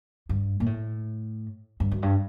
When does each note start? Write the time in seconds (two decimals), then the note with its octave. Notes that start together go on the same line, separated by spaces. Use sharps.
0.29 G2
0.60 A#2
0.66 A2
1.80 G2
1.91 F#2
2.02 G2